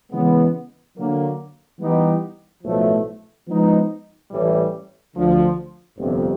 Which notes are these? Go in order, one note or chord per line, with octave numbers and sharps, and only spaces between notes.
C#3 E3 G#3 B3
D3 F#3 A#3
E3 G3 B3 D#4 G4
B1 A2 F3 A3
F3 G#3 B3 D#4
A1 A2 E3 G3
D2 D3 F3
G1 F2 C3